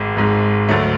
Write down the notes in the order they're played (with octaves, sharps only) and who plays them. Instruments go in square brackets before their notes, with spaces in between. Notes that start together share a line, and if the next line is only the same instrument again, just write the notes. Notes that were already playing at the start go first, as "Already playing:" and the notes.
Already playing: [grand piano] G#1 G#2 G#3
G#1 G#2 G#3
D2 D3 F#3 A3